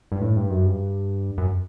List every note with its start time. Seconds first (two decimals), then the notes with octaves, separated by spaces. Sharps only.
0.12 G2
0.21 A2
0.36 G2
0.50 F#2
0.65 G2
1.38 F#2